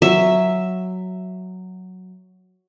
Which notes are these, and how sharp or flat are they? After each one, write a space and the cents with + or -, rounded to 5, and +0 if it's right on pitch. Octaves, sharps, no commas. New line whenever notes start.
F#3 +0 E5 +0